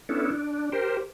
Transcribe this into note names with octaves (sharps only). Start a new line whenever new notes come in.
B3 C#4 D4 E4 A4
D4
G4 A#4 C5